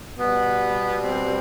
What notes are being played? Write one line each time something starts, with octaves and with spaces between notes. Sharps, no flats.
B2 G3 B3
C4